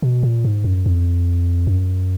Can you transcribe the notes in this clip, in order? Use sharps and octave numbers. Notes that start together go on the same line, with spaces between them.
B2
A#2
G#2
F#2
F2
F#2